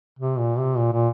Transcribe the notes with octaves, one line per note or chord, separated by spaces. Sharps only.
C3
A#2
C3
A#2
A#2